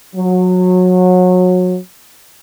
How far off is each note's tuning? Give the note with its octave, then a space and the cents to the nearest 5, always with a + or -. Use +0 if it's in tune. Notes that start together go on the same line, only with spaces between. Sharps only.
F#3 -25